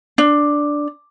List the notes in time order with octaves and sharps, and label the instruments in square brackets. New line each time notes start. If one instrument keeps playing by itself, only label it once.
[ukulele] D4